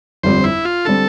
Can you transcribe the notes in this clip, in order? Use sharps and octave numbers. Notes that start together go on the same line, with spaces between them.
G1 F2 D3 G3 C4 C5
E4
F4
D3 G3 C4 A4